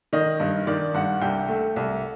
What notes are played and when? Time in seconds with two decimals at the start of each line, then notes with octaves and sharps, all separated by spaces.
0.13 D#3 D#5
0.40 G2
0.67 D#3 D5
0.94 G2 F#5
1.21 C2 G5
1.48 A3
1.76 C2